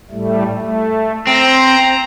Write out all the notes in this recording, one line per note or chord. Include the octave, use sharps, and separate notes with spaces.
A2 G3 A3
A3
C4 C5 A#5